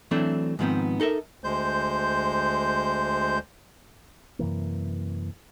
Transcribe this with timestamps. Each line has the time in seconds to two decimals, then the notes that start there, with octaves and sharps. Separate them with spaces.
0.11 E3 F#3 A3 C4 D4
0.59 G#2 D#3 F3 A3 B3 C4
1.00 D#4 A4 A#4 E5
1.44 D2 G#3 C5 G6
4.39 F#2 C3 E3 A#3